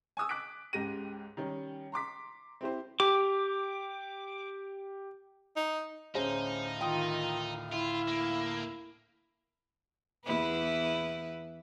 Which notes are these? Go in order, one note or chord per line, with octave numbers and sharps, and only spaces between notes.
G#5 C#6 D#6 E6
D6 F#6 B6 D7
C#2 G#2 G4 A#6 D#7
D#3 G3 C#4
A#5 C6 D6 B6
C4 E4 G4 C5
G4 D6
D#4
D2 A2 C#4 D#4 G#4 C5 F5
D#3 F4 G5 D#6
E4 F4
A#3
E2 E4 B4